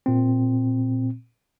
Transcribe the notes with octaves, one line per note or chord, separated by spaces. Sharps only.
A#2 C4